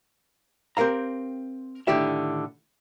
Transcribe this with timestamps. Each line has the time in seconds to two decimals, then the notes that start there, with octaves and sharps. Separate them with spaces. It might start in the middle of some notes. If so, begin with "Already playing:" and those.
0.77 C4 G4 A#4 F5 A#5
1.87 A2 D3 D#3 E4 G4 E5